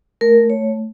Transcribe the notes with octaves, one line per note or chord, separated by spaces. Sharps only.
A3 A#4
A3 C#5